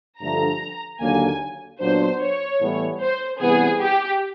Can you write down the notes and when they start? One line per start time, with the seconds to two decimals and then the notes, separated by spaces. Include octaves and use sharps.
0.20 G2 D3 F3 A3 A#5
1.00 D#2 D3 F#3 A#3 G#5
1.80 A#2 F#3 B3 D4 C5
2.21 C#5
2.60 A2 E3 G3 B3 E4
3.00 C5
3.39 C3 E3 G3 B3 G#4
3.80 G4